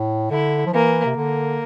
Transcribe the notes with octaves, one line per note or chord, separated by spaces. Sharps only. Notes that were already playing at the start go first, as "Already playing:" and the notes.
Already playing: A2
D3 E4
F3
E3 A#3
C3
D3 A#3